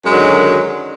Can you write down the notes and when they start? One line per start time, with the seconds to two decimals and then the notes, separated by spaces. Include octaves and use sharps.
0.04 F#2
0.07 G#3
0.09 F#3
0.12 D#3
0.14 D3